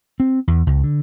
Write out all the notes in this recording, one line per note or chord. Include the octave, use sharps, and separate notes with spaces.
C4
E2
C#2
D3